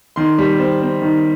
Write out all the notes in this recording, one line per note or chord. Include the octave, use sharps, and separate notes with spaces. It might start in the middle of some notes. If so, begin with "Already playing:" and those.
D#3 C6
G3
C4
C4
D#3